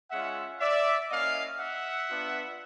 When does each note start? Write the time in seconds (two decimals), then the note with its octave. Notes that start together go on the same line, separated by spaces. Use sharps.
0.10 G#3 C#4 F4 E5 F#5
0.60 D5 E5
1.09 A#3 C#4 E4 D#5 F5
1.59 E5 F#5
2.09 B3 D4 F4